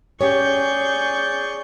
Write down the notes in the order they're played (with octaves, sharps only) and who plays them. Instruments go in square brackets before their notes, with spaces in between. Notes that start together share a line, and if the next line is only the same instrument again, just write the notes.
[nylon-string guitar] C#4 G4 C#5 [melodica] G#4 D5 [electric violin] C#6 G6